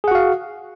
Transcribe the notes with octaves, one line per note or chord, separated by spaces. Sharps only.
F#4 G#4 F5 F#5